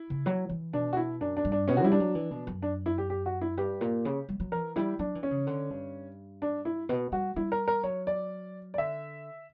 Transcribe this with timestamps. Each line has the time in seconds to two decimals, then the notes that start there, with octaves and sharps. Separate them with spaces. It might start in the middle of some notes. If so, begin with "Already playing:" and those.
Already playing: E4
0.10 C#3
0.26 F#3
0.49 E3
0.73 B2 D4
0.93 F#4
0.97 E4
1.21 F#2 D4
1.37 D4
1.45 G2
1.52 D4
1.68 B2 C#4
1.77 F#4
1.83 G3 E4
1.92 D4
2.00 F#3
2.15 E3
2.31 B2
2.47 F#2
2.62 D4
2.86 E4
2.98 G4
3.10 G4
3.26 F#4
3.41 E4
3.57 G2 G4
3.81 A#2
4.05 C#3
4.29 G3
4.40 F#3
4.52 E3 A#4
4.76 G3 E4
4.99 F#3 D4
5.15 E3
5.23 C#4
5.31 C#3
5.47 D3
5.70 G2
6.42 D4
6.65 E4
6.89 B2
7.12 G3 F#4
7.36 G3 E4
7.52 A#4
7.68 A#4
7.83 F#3 C#5
8.07 D5
8.74 D5
8.78 D3 E5